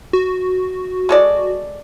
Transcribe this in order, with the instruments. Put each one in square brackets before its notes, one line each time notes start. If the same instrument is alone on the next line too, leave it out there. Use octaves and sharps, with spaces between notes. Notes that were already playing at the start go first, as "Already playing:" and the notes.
[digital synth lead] F#4
[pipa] G#3 A4 D5